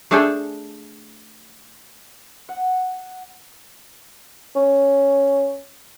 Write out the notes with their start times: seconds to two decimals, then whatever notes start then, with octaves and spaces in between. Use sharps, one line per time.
0.11 A3 D4 G#4 A4 G5 G#5
2.49 F#5
4.56 C#4